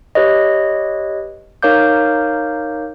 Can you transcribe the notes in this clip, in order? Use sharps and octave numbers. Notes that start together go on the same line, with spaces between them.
G4 B4 C#5 D#5
D#4 A#4 C#5 F5 D6 G6